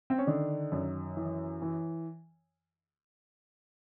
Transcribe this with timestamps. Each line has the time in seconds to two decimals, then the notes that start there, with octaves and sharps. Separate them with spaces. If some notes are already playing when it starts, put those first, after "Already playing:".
0.10 C4
0.18 C#4
0.27 D3 D#3 D4
0.72 F#2
1.17 E3
1.62 E3